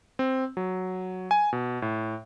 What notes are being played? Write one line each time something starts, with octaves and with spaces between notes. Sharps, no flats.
C4
F#3
G#5
B2
A2